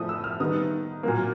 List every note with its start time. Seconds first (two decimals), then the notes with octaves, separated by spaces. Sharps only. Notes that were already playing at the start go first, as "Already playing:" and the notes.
Already playing: A2 F3 A3 D#6
0.09 E6
0.24 F6
0.40 D#3 G3 B3 D#4 D#6
1.03 A#2 F#3 A#3